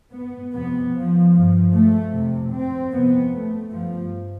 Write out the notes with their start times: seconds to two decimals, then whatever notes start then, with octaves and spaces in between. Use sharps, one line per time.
0.13 B3
0.54 F2 C3 B3
0.93 F3
1.33 G2 F3
1.73 A3
2.13 F2 C3
2.52 C4
2.92 F2 C3 B3
3.32 A3
3.73 G2 F3